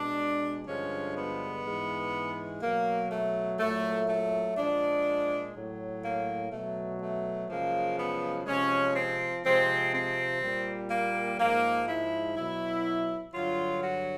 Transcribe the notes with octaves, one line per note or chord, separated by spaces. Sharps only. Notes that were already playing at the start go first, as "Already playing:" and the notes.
Already playing: B2 G#3 D4
G2 D3 F3 G#3 C#4
B3
G#2 E3 G#3
B2 F#3 A#3
A3
A#2 F#3 A3
A3
A#2 F3 G#3 D4
A2 F#3
A#3
B2 F#3 A3
A3
F#2 C#3 F3 G#3 A#3
B3
C3 F3 G#3 C#4
C4
C3 F3 G#3 C4
C4
A#2 G3
A#3
G#2 F3 G#3 A#3
E4
B2 F#3 E4
G2 D3 F#3 F4
F#4